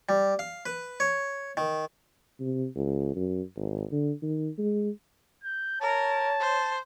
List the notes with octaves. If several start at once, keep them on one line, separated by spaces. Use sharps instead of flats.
G3
F5
B4
C#5
D#3
C3
C#2
F#2
G#1
D3
D#3
G#3
G6
A#4 C#5 A5
C5